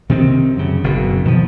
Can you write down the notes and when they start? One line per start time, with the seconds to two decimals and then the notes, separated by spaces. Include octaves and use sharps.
0.09 C3 D#3 C4
0.56 F#2 C#3
0.84 F#1 B2
1.25 B2 D#3 F3